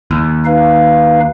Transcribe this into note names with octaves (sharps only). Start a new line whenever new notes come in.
D#2
D#4 B4 F5